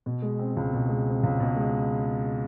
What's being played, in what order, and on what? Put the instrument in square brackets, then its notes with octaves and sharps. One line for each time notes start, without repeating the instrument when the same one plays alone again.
[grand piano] B2
G#3
C4
C#2
B2
G#3
C4
C#2
B2
G#3